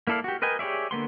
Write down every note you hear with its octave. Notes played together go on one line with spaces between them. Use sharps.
A#3 E4 A4 D5 F5
F#4 G4
A#4 B4 D#5 G5 G#5
G4 G#4 C#5 D5 E5
D3 A#3 B3 C6